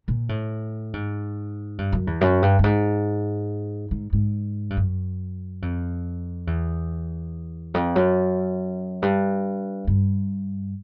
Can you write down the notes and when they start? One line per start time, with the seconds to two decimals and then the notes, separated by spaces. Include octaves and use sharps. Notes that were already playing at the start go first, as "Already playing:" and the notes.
0.08 A#2
0.29 A2
0.93 G#2
1.78 G2
1.92 F#2
2.07 E2
2.21 F#2
2.42 G2
2.59 G2
2.64 G#2
3.91 G#2
4.13 G#2
4.70 G2
4.77 F#2
5.62 F2
6.47 E2
7.74 F2
7.95 F#2
9.02 G2
9.87 G2